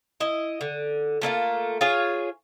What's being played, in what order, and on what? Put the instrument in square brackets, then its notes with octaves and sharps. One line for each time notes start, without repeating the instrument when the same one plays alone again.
[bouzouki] E4 D#5
D3
A3 A#3 C#4 F4
F4 G#4 C#5